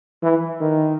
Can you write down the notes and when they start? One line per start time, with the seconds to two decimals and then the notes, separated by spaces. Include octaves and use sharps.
0.23 E3
0.61 D#3